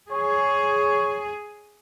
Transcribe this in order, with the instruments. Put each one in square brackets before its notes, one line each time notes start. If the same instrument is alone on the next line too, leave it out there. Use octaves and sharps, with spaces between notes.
[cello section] G#4 [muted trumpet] C#5